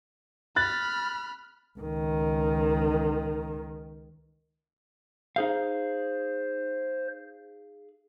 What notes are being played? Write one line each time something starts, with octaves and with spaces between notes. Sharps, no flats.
B5 F6 F#6 A6
C#2 D#3
D#4 G#4 C5 F5